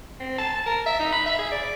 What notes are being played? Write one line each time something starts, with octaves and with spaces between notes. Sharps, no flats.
C4
A5
A5
A#4
E5
D#4
B5
E5
G#4
D5